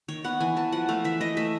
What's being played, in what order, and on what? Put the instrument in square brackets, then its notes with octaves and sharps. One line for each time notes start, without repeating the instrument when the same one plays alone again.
[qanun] D#3 C#5
B3 F#5
E3 G#5
E3 A5
F3 F#5
A3 F5
E3 E5
E3 D#5
A3 E5